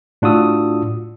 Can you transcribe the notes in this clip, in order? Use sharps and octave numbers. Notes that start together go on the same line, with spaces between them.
A2 D4 F4 F#4 D#6 E6